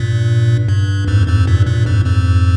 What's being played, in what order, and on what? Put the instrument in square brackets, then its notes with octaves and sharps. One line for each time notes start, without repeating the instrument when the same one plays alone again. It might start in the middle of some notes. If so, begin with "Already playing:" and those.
Already playing: [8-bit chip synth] G2 A#2
G2
F2 G#2
F2 G#2
G2 A#2
G2 A#2
F2 G#2
F2 G#2